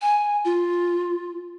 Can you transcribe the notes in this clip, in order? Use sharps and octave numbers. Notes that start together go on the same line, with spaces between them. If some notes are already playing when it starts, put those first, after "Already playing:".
G#5
F4